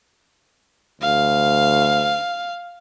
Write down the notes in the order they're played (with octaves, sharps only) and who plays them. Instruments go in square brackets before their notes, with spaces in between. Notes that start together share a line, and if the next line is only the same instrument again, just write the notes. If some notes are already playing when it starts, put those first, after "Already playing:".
[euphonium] D2 [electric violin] F5